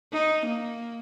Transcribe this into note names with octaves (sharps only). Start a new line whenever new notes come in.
D#4
A#3